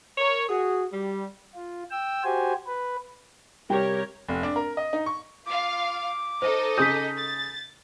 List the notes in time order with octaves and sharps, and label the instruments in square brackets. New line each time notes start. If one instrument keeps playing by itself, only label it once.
[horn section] A#4 C#5
F#4 G#4
G3
[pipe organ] F4
G5 E6
F#4 G4 C5 G#5
B4
[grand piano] C3 G3 G5 [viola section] G4 A#4 C#5
[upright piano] F1
D4
A#4
D#5
D#4
C#6
[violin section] F4 F5 [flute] D6
[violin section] D#4 A4 D#5 [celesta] C5
[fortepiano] C#3 G#4 D#6 [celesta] G6 B6
[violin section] A6